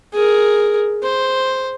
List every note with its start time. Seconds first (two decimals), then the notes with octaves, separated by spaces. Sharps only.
0.14 G#4 A#4
1.03 C5